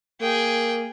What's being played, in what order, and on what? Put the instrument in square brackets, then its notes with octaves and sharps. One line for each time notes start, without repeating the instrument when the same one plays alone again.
[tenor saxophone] A#3 [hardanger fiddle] G#4 G5